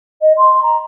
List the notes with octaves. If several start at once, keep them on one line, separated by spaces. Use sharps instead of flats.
D#5
C6
A#5